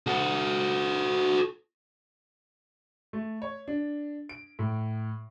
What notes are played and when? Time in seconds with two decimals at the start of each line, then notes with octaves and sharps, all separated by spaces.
0.07 F#4 A4
3.13 A3
3.42 C#5
3.68 D4
4.29 D7
4.59 A2